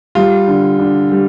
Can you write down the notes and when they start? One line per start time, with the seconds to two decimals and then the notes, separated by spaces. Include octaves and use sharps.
0.15 G3 F4
0.48 D3
0.79 D3
1.12 G3